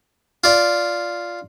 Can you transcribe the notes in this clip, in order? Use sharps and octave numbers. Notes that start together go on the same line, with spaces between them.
F4 D5